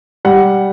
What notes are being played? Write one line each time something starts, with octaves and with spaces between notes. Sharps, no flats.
G3 F#5